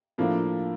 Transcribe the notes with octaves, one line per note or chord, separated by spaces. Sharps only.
A2 F3 A#3 D4